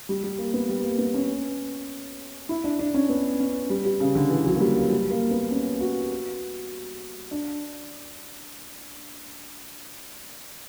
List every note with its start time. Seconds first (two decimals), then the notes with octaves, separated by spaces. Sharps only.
0.09 G3
0.24 G3
0.38 A#3
0.54 B3
0.68 G3
0.84 A#3
0.98 B3
1.14 C#4
2.49 E4
2.64 D4
2.79 D4
2.94 C#4
3.09 B3
3.40 C#4
3.70 G3
3.85 G3
4.00 C#3
4.15 D3
4.30 E3
4.46 F#3
4.55 A#3
4.60 G3
4.76 A#3
4.90 G3
5.10 A#3
5.31 B3
5.51 C#4
5.81 F#4
7.31 D4